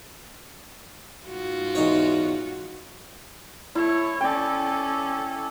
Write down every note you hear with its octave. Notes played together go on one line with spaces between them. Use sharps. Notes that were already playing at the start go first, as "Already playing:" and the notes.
G#2 F4 F#4
E2 D#4 C#5
A3 E4 C#5
C#4 A4 D5 G5